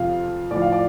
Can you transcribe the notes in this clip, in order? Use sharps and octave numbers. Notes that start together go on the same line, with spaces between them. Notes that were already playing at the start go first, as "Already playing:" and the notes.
Already playing: F2 C3 F3 F4 F5
A2 F3 D5
F5
D5